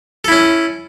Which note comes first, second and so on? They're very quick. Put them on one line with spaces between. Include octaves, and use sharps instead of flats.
A4 E4 C#4